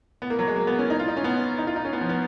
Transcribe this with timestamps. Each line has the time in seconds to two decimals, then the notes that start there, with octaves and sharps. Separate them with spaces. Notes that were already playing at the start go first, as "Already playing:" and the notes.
0.22 B3
0.30 A#3
0.39 F#3
0.48 G#3
0.56 A#3
0.67 B3
0.79 C#4
0.90 D#4
0.99 F4
1.08 D#4
1.17 C#4
1.24 B3
1.58 D#4
1.67 F4
1.76 D#4
1.85 C#4
1.93 B3
2.01 F3
2.09 B3